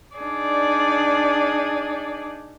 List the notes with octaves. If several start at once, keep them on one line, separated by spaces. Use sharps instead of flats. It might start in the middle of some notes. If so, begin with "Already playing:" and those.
D4 D#4 G#4 D5